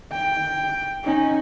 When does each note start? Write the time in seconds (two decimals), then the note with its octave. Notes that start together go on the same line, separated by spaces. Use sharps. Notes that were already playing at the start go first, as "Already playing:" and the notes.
0.12 G5
1.04 C#4 D#4